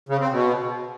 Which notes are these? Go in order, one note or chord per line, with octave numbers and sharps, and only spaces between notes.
C#3
C4
B2